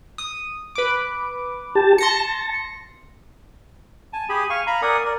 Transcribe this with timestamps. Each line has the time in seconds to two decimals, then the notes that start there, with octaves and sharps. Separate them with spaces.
0.18 D#6
0.75 B4 D6
1.75 G4 A5
1.98 A5 C6 A#6 C#7
4.13 G#5 A5
4.29 G4 G#4 G#5 B5
4.50 F5 G#5 C#6
4.67 F5 A#5 B5
4.82 A#4 D5 F#5 G#5 D#6
5.05 A#4 D5